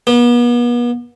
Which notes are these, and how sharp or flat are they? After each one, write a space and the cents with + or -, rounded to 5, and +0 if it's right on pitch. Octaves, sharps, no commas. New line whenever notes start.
B3 -40